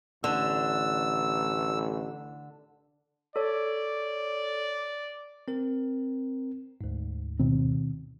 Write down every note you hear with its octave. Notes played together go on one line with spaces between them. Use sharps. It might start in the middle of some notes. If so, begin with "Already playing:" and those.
A1 D3 E6
A4 C#5 D5
C4 A#4
D2 G#2
B2 D#3 C4